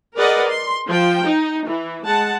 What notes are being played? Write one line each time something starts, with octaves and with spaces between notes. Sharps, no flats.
G#4 A#4 B4 D5 D#5 F#5
C6
F3 G5
D#4
E3
G#3 F#5 A5